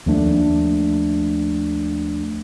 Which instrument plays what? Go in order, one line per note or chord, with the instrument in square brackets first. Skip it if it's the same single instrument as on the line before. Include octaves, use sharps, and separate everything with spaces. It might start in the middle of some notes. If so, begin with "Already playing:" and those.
[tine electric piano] D#2 F3 A3 D4